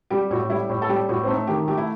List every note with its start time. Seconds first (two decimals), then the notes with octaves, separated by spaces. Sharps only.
0.10 G3 G4
0.31 A2 F#4
0.50 G3 E4
0.69 A2
0.82 A4
0.89 G3 G4
1.09 A2 F#4
1.24 C4
1.28 A3 D#4
1.47 D#3 G4
1.68 A3 G4
1.77 E4